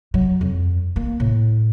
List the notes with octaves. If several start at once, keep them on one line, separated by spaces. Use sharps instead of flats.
F#3
F2
A#3
A2